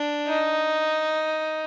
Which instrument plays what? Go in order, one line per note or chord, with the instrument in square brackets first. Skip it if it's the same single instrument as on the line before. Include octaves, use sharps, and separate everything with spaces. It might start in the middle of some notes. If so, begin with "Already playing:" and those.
Already playing: [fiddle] D4
D#4